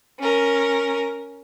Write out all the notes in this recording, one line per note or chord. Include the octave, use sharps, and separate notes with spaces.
C#4 A#4